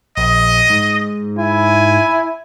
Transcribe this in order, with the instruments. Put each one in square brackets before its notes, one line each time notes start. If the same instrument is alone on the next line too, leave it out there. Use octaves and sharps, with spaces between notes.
[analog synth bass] A#1 [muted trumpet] D#5
[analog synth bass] G#2
[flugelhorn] E4 [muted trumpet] G#5